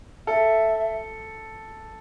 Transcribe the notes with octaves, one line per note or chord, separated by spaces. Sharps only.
A4 E5